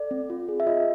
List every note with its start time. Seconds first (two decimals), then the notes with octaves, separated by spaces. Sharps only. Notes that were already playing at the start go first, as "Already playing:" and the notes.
Already playing: A4 D5
0.11 C4
0.30 F4
0.49 G#4
0.60 E5
0.67 F4 D#5